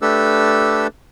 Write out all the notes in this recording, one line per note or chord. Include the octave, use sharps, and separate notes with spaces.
A3 D4 G4 A4 B4 E6